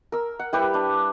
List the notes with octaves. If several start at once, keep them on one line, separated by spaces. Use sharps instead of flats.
A#4 E6
F#5
G3 E4 G4 B4
D4